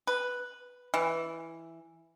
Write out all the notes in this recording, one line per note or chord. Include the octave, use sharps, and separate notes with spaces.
B4
E3